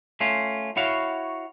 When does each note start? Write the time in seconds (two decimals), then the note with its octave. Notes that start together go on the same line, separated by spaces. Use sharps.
0.20 A3 C#4 F4
0.77 E4 F#4 C#5 F5